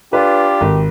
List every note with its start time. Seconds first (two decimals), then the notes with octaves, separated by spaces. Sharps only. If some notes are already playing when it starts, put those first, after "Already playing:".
0.13 D4 F4 G4 B4
0.61 G#1